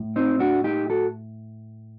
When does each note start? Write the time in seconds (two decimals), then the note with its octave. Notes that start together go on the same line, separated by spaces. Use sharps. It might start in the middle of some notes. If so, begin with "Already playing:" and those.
Already playing: A2
0.16 C4 D#4
0.39 D4 F#4
0.64 D#4 G4
0.90 F#4 A4